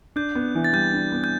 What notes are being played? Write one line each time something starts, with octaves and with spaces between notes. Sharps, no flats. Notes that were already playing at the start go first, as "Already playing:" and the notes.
D4 G6
B3
E3
A6
G3 G6
D4
B3
G6